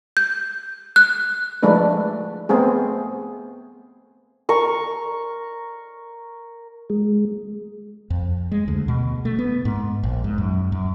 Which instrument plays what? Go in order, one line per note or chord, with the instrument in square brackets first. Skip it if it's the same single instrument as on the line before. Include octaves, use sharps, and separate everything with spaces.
[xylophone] G6
F#6
[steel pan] F3 G#3 A3 D4 B4
A3 B3 C4 G#4
[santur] A#4 C#6
[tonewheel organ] G#3
[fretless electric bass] F2
G#3
D2
B2
A3
B3
G#2
A#1
G#2
F#2
F#2